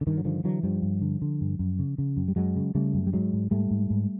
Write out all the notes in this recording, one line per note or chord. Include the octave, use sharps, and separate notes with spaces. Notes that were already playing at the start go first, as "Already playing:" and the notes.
D3
G2 D#3
F#3
D3 D#3 F3
D3 E3 F#3
G2 F3 G3
G2
D3
D3
G2
F#2
C#3
C#3
F#2
G3
F#2 F#3 G#3
C#3
C#3 G3 A3
F#2
G3
G#2 F#3 G#3
G#2
G#2 G3 A3
G#2
G#2